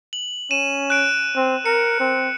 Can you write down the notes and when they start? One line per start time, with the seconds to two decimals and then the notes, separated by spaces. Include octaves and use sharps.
0.13 F#7
0.51 C#4 D#7 E7
0.90 F#6 D7
1.36 C4
1.66 A#4 C#7
2.00 C4